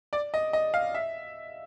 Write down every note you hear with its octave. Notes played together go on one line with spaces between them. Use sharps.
D5
D#5
D#5
F5
E5